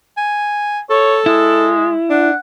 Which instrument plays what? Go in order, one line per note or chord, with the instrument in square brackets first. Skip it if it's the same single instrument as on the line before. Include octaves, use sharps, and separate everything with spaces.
[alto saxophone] G#5
[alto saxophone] A4 [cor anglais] C#5
[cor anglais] G#3 [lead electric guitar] E4
[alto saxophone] D4 [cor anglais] F#5